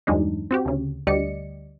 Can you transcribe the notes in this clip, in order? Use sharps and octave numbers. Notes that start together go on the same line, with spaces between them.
E2 G2 F#3 G#3 D4 D#4
C4 F#4 G4
D2 C#3
D2 G3 G4 D5 D#5 C#7